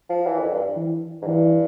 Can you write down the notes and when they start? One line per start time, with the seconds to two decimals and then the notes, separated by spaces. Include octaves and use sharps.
0.09 F3
0.27 E3
0.39 F2
0.51 G2
0.77 E3
1.22 G#2
1.26 G2 E3